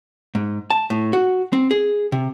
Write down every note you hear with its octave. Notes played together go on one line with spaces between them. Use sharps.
G#2
A5
A2
F#4
C4
G#4
C3